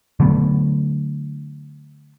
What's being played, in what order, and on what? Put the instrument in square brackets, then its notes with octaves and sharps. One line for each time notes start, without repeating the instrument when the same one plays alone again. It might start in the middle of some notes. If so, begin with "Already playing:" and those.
[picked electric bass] D3 F#3 A3 B3